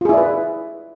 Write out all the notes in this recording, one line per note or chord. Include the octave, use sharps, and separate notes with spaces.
E4 F4 G#4 B4 D5